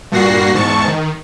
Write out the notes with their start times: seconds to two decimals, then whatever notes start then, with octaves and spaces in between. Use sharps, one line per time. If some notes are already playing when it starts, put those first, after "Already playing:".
0.12 G2 A#2 F#4 A#6 C7
0.54 E2 G#2 A5 C#6
0.87 D#3